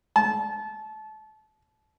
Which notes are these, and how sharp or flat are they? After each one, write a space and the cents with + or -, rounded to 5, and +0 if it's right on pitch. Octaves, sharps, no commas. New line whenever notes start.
A5 -25